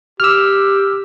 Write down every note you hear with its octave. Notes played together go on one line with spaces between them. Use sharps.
G4 E6 F6